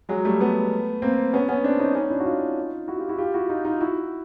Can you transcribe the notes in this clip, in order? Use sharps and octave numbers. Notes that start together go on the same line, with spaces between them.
F#3 G#3
G3 A3
A3 B3
A#3 C4
B3 C#4
B3 C#4
C4 D4
C#4 D#4
C#4 D#4
D4 E4
F#4
D#4 F4
E4 F#4
F4 G4
E4 F#4
F4 G4
E4 F#4
D#4 F4
D#4 F4
E4 F#4